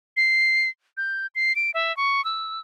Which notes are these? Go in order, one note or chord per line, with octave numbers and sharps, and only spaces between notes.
C7
G6
C7
D7
E5
C#6
E6